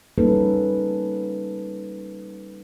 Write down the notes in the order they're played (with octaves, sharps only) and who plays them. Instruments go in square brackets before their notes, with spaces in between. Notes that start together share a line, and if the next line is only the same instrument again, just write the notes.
[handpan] G3 A#3 C#4 D#4 A4 B4